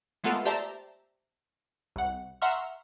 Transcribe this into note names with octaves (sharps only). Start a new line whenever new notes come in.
G#3 A3 B3 F4 A4 A#4
G4 C5 D5 E5 A5 A#5
C2 F#5
E5 F#5 A#5 C6 C#6 F6